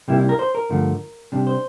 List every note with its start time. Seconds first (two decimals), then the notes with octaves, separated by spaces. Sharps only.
0.08 C2 C3 G3 A#3 E4
0.19 E4
0.29 A#4
0.39 C5
0.55 A#4
0.69 G2 D3 F3 A3
1.32 C3 G3 D4
1.47 C5